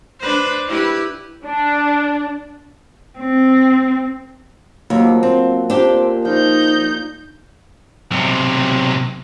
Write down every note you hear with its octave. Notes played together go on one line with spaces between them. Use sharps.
D4 B4 C5
E4 G4 B4
D4
C4
D#2 F3 F#3 A#3
C4
A#2 C4 D4 G4
F3 D#4 G6
B1 C3